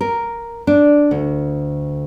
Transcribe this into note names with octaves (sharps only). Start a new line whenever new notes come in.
A#4
D4
D2